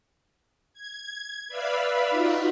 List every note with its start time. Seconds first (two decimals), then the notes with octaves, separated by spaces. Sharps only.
0.74 G#6
1.48 B4 D5 E5 F5 B5
2.10 D#4 F4 F#4